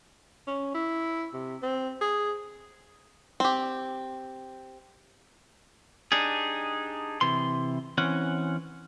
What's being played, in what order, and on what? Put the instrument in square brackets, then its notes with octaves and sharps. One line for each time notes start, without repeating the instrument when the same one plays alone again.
[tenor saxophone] C#4
E4
C3
C4
G#4
[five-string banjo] C4 G4
[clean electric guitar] D4 D#4 G4 G#4
C3 E3 C6
E3 C4 C#4 F#5